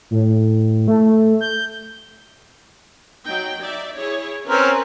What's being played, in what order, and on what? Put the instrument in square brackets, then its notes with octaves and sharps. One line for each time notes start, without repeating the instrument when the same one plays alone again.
[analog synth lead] A2
A3
G6
[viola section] F#3 D#4 G5
D#4 D5 E5
E4 G#4 C#5
[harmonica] C4 C#4 A#4 [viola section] B4